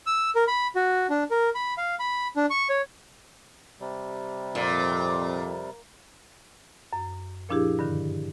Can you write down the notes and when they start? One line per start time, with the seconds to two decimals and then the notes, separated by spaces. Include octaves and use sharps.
0.06 E6
0.35 A#4
0.48 B5
0.75 F#4
1.10 D4
1.31 A#4
1.55 B5
1.78 F5
2.00 B5
2.36 D4
2.50 C#6
2.69 C#5
3.80 C3 G3
4.55 F2 A#2
6.93 F#2
7.49 A#2 F3 D4 E4 G4 G#4
7.79 G2 D3 D#3